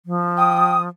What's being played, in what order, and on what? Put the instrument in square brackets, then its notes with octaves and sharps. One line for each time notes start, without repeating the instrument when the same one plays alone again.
[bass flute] F3
[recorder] G5 [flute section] D#6